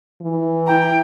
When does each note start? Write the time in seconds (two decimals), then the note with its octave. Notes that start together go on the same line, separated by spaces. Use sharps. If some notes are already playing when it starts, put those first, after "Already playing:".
0.21 E3
0.67 E4 G5 A#5